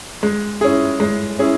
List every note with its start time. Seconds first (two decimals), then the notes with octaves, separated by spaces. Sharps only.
0.23 G#3
0.61 C#4 E4 G#4
1.00 G#3
1.39 C#4 E4 G#4